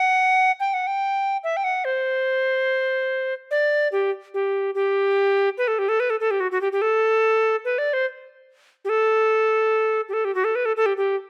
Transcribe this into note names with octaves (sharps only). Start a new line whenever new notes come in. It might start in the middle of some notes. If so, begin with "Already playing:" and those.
Already playing: F#5
G5
F#5
G5
E5
G5
F#5
C5
D5
G4
G4
G4
B4
A4
G4
A4
B4
A4
A4
G4
F#4
F#4
G4
G4
A4
B4
D5
C5
G4
A4
G4
A4
G4
F#4
A4
B4
A4
A4
G4
G4